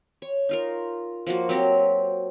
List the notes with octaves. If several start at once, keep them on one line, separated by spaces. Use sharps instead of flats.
C#5
D#4 F4 A#4
F3 A#3 F#4
F#3 C4 G4 A#5